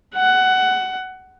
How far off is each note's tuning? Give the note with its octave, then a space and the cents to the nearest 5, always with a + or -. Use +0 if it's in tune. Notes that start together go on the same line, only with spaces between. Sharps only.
F#5 +15